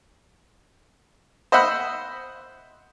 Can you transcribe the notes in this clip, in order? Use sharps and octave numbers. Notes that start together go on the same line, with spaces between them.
C5 D#5 E5 F#5 B5